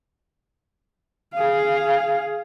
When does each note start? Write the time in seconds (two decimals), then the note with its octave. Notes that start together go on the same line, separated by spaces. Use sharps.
1.34 G#4 F5